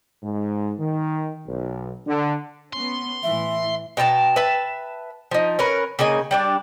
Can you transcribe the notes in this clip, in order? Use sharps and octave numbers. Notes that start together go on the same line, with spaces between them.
G#2
D#3
B1
D3
B3 C#4 C6
A2 E3 E5
B2 G5 A5 A#5
B4 E5 A5
F3 D#4
C#4 A#4 B4
C#3 A#3 D#4 G#5
G3 D4 D5